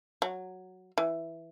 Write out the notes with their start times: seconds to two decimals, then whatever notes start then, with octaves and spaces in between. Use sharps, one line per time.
0.22 F#3
0.98 E3